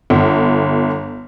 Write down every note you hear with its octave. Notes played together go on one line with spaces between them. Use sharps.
G1